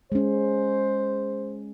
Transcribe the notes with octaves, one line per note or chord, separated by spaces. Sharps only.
G#3 C#4 C5